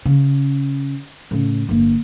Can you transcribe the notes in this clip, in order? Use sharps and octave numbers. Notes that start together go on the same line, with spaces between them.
C#3
A2 C#3
G1 A#3